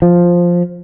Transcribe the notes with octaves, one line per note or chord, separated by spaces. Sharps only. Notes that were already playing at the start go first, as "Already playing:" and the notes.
F3